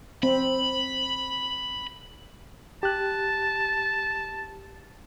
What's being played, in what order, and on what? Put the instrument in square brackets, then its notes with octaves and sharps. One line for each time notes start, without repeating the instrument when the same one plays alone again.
[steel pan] C4 [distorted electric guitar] B5
[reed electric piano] G4 F#6 [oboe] A5